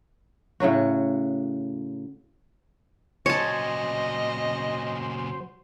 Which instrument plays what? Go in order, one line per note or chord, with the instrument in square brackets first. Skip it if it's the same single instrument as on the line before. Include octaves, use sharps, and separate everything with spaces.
[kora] A2 C#3 F#3 F#4
[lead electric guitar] A#2 C#3 [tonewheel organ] F#3 C5 [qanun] C#5 A5 [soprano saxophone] D#5